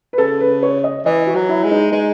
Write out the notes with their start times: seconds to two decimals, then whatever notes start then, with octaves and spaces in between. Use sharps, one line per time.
0.13 B4
0.18 C#3 A4
0.40 B4
0.63 C#5
0.84 D#5
1.06 E3 D#5
1.27 F#4
1.35 F#3
1.49 E4
1.64 G#3
1.71 D#4
1.92 G#3 D#4